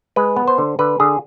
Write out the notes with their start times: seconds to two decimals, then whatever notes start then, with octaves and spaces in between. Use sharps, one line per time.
0.16 G#3 B4
0.36 B3
0.48 C5
0.58 D3
0.79 D3 B4
1.00 D3 G#4